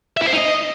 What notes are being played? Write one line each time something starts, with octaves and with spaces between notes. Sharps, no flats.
E5
E4
C5
D#4
D#5